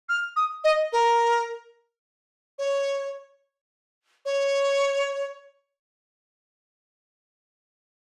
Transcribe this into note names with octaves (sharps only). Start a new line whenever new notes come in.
F6
D#6
D#5
A#4
C#5
C#5